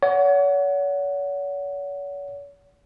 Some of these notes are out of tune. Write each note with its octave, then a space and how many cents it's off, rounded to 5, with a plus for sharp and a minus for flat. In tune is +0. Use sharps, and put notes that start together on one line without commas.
C#5 +40 F#5 +0